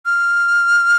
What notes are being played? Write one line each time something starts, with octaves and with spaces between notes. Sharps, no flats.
F6